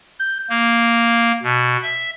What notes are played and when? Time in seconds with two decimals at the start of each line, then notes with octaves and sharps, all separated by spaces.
0.19 G6
0.50 A#3
1.43 B2
1.83 E5